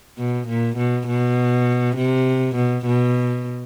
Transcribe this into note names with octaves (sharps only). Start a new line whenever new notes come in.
B2
A#2
B2
B2
C3
B2
B2